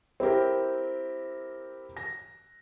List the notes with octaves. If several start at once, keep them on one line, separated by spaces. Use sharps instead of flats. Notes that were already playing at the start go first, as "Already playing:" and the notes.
C4 E4 G4 A#4
A#6